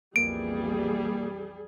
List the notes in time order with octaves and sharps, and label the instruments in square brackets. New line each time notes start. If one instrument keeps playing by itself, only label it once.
[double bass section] B1 F2 E3 [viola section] G3 G#4 [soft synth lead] A#3 [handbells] D7